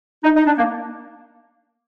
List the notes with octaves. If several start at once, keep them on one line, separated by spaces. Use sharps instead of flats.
D#4
D#4
D4
A#3